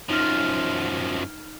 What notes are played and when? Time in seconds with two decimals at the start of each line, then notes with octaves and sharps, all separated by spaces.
0.09 F#2 F3 D#4 F6